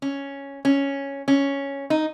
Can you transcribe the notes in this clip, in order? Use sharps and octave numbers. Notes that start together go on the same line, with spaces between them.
C#4
C#4
C#4
D#4